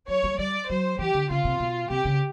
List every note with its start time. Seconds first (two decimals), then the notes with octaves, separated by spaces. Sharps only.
0.08 F#3 C#5
0.24 G3
0.39 G3 D5
0.69 F#3 C5
0.99 E3 G4
1.14 D3
1.30 C#3 F4
1.45 C3
1.60 B2
1.90 C3 G4
2.05 C#3